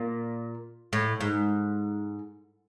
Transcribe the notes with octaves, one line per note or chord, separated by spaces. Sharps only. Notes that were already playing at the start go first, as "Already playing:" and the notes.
Already playing: A#2
A2
G#2